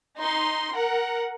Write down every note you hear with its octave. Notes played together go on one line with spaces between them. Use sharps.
D#4 C6
A#4 F#5